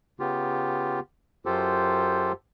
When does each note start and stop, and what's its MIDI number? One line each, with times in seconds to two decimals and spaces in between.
0.20 1.00 49
0.20 1.00 59
0.20 1.00 65
0.20 1.00 67
1.46 2.32 42
1.46 2.32 65
1.46 2.32 67
1.46 2.32 69
1.46 2.32 72